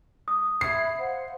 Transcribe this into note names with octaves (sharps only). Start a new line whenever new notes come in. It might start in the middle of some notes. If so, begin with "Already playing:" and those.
D#6
E5 B5 G#6 C7
C5 F5 F#5